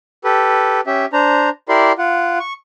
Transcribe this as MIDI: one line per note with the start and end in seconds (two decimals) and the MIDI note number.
0.24 0.81 67
0.24 0.81 69
0.24 0.81 71
0.87 1.06 61
0.87 1.06 67
0.87 1.06 76
1.13 1.49 62
1.13 1.49 72
1.13 1.49 82
1.69 1.92 64
1.69 1.92 67
1.69 1.92 70
1.69 1.92 74
1.69 1.92 84
1.98 2.38 65
1.98 2.38 78
2.40 2.53 85